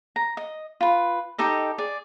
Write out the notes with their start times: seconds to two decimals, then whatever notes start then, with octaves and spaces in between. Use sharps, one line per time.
0.16 A#5
0.37 D#5
0.81 F4 B4
1.38 D#4 G4 A4 D#5
1.78 G#4 D5